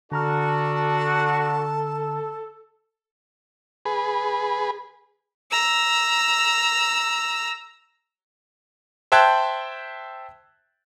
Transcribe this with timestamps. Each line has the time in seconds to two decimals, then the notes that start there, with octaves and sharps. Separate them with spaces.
0.12 D3 D4 F#4 A4 A5 A#5 F6
3.86 G#4 B4
5.51 A#5 E6
9.12 C5 E5 G5 A5 F#6 G#6